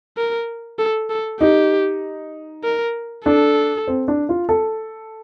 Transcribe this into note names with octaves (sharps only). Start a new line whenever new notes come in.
A#4
A4
A4
D#4 G4
A#4
D4 A4
C4
D4
F4
A4